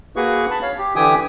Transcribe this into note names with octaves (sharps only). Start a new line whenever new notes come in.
A#3 F#4 G#4 B4 C#6
A5 B5
C#5 F5
G4
D3 E3 G4 G5 G#5 D#6